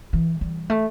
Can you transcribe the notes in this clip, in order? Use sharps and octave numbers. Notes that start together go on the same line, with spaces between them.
E3
G3
A3